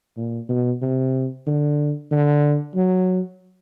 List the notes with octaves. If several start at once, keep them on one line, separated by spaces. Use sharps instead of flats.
A#2
B2
C3
D3
D3
F#3